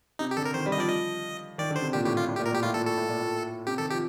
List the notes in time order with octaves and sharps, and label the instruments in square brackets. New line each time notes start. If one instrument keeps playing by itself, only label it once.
[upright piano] C3 [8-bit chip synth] D#4
[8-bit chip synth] G4
[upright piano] D3 [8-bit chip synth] A4
[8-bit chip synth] A#4
[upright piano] D#3 [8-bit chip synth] C5
[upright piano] G3
[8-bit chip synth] D#5
[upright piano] F3 [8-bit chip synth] D5
[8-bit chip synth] D#5
[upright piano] D#3 [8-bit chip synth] D5
[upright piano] D3
[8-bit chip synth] C5
[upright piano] C3
[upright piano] A#2 [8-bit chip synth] G4
[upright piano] A2 [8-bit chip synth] G4
[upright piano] A#2 [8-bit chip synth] F4
[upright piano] A2
[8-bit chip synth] G4
[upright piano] A#2
[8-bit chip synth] A#4
[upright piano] A#2 [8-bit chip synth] G4
[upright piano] A2 [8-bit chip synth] F4
[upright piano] A#2 [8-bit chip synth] A4
[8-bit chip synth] A4
[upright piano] A2
A#2
A#2
[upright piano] C3 [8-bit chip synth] G4
[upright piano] D#3 [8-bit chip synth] A4
[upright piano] F3 [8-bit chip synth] G4